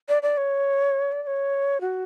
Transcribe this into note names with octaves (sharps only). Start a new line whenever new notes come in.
D5
D5
C#5
D5
D5
C#5
F#4